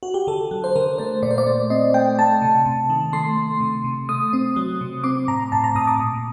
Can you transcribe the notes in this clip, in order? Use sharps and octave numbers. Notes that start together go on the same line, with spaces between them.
F#4
G4
D3 A4
F#3
C5
D3 A#4
A3 C5
A#2 D5
C5
D5
A3
C4 D#5
A3 G5
A3 A5
C3
C3
D#3
A3 C6
A3
C3
C3
A3 D#6
C4
F#3
C3
C4 D6
A2 A#5
A2 A5
A#5
A2 D#6
D6
A#2